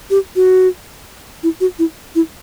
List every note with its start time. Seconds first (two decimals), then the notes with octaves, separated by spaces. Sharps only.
0.10 G4
0.36 F#4
1.43 E4
1.61 F#4
1.79 E4
2.15 E4